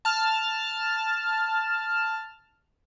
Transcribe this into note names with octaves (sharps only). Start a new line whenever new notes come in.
A5 F6